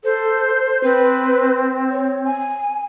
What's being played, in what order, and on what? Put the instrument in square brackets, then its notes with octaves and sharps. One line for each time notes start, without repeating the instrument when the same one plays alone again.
[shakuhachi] A4 [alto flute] C5
[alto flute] C4 [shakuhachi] B4
[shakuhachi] C#5
G#5